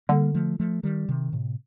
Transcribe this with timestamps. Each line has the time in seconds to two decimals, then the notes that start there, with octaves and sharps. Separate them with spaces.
0.09 D3 G3 A#3
0.34 F3 A3
0.59 F3 A3
0.83 D#3 G3
1.09 C3 D#3
1.33 A2 C3